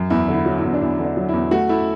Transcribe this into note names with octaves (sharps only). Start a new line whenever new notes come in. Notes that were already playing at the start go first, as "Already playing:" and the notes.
Already playing: F#2
E2 E4
D3
E4
F#3
E4
E2
D4
E2 E4
D3
D4
F#3
E2 E4
A3 F#4
A3 E4